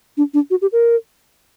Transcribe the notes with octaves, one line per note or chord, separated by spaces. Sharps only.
D4
D4
F#4
G4
A#4